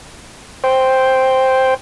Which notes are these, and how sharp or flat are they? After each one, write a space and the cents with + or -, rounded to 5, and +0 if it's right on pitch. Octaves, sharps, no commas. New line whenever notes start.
C5 +0 G5 +0